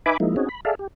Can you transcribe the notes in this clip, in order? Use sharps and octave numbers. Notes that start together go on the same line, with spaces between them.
D#4 B4 E5 G#5 B5 D6
F3 G#3 A#3 D#4 E4
C4 C#4 D#4 F#4 G#4
B5
G#4 A4 D5 E5 F5
G4